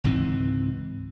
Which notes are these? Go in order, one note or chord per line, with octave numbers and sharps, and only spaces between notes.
C#2 G#2 E3 C4